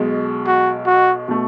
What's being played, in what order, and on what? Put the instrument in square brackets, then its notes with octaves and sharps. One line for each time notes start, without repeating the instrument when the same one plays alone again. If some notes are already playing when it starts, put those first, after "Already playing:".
Already playing: [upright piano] B1 B2 G#3
[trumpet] F#4
F#4
[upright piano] B2 A3